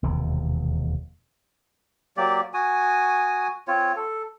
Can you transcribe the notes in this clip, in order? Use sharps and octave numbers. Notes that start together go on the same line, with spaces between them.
E1 D#2 C3
F#3 A#3 G4 D5
F#4 G#5 D#6
C4 F4 C#5
A4